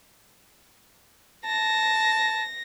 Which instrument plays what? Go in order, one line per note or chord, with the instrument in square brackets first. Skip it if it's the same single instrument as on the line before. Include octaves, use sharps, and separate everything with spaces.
[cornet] A5 [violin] A#6